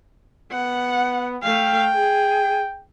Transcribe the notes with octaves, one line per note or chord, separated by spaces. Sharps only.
B3 F#5
A3 F5 G5
G#4